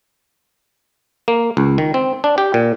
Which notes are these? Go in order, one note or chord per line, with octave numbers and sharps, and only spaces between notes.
A#3
C#2
D#3
C4
D4
G4
A#2